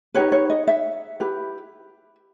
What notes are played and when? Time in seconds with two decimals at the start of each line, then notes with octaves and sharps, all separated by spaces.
0.14 D#4 G4 B4 C#5
0.32 C#5
0.50 D#5
0.67 E5
1.20 E4 G4 B4